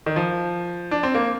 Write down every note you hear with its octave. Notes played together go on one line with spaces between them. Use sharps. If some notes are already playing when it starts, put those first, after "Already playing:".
D#3
F3
D4
C4
A#3